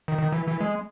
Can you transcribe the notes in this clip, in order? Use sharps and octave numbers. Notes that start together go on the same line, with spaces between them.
D#3
D#3
E3
E3
G#3